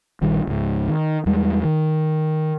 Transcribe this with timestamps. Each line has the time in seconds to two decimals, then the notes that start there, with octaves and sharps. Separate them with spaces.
0.22 A#1 D#3 G3
0.47 C#2 G#2
0.88 D#3
1.26 E2 G3 G#3
1.64 D#3